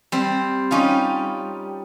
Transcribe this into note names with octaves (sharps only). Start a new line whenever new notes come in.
G3 C4
G3 C#4 D#4 F4